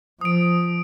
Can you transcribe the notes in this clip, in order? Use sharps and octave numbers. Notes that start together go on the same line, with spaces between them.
F3 D#6 D7